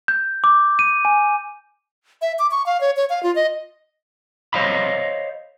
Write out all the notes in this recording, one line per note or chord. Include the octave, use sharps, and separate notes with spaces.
G6
D6
D#7
G#5
E5
D6
C#6
F5
C#5
C#5
F5
F4
D#5
C5 C#5 D#5 F5 B5